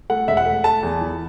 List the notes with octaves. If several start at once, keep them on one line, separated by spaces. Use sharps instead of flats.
A3 F#5
E1 E5
F#5
A3
A3 A5
E2
E3